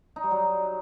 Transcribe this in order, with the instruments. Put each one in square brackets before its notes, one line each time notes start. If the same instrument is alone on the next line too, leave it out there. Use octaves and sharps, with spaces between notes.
[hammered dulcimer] D#4
G3
F#3